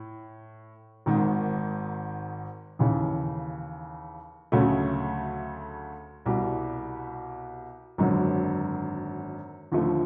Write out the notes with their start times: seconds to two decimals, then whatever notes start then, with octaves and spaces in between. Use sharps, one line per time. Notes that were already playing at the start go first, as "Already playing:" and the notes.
Already playing: A2
1.06 G#1 G#2 D#3
2.79 D#2 C#3 E3
4.52 D2 C#3 F#3 A3 C#4
6.26 C2 B2 G3
7.98 G#1 F#2 D3 F#3
9.72 D#2 D3 F3 A3